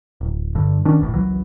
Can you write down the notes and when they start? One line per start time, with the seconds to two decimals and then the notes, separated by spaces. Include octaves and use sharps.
0.21 D1
0.55 G1 G2 D3
0.85 D#3 C#4 D4
0.99 E1 B1 A2
1.14 G#1 C#2 E3 F#3